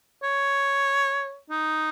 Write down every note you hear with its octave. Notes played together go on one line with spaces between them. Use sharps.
C#5
D#4